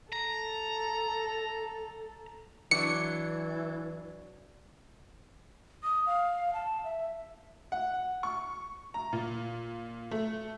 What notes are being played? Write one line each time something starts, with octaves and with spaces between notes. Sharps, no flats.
A4 A#5
E3 F#3 D4 C#7
D#6
F5
A5
E5
F#5
C#6
A#5
A#2
A3